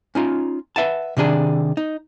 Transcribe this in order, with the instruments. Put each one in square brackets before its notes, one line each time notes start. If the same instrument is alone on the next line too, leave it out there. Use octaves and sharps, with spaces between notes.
[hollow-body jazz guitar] C#4 D#4 F4
B4 E5 F#5 A5
C3 D#3 D4 G#4
D#4